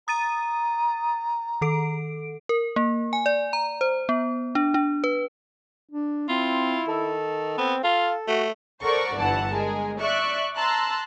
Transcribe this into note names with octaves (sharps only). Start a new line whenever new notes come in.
A#5 D#6 A6 D#7
D#3 A4 D7
A#4
A#3
G#5
D5
A#5
C5
B3
D4
D4
B4
D4
C4 E4 F4
D#3 A4
B3 C4
F4 A4 F5
A3 F#4
A4 A#4 C5 D5 F#5 C#6
G1 G2 E3 F#5 A5
G#3 G#4 A#4
D5 E5 C#6 F#6
A5 A#5 C6 E6 F#6 A6